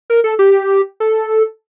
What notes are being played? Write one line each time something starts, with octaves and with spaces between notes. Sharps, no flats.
A#4
A4
G4
A4